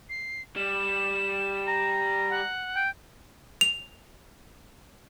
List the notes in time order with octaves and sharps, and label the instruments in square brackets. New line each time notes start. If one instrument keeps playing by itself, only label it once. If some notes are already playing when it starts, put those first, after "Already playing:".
[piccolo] C7
[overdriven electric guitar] G3 [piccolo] E7
[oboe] A#5
[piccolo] F#5
[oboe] G5
[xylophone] F7